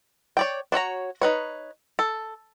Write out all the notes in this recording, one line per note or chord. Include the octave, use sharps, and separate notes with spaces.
C#5 D5 G5
D4 F#4 C#5 A#5
D#4 B4 C#5
A4